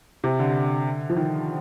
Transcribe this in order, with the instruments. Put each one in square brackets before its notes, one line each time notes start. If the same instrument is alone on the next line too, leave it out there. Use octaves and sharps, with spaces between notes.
[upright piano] C3
D3
F3
D#3